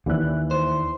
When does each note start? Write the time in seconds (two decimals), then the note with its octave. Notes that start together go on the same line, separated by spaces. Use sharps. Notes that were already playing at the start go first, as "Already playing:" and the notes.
0.06 D#2 E3 D5 F#6
0.51 C5